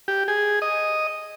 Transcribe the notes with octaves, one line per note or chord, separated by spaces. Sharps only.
G4
G#4
D#5